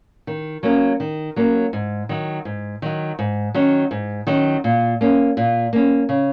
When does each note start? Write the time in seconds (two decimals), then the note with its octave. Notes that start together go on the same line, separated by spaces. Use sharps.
0.27 D#3
0.63 F#3 A#3 C#4
1.00 D#3
1.36 F#3 A#3 C#4
1.73 G#2
2.09 D#3 F#3
2.45 G#2
2.82 D#3 F#3
3.19 G#2
3.54 D#3 F#3 C#4
3.91 G#2
4.27 D#3 F#3 C#4
4.64 A#2
5.01 A#3 C#4
5.37 A#2
5.73 A#3 C#4
6.09 C#3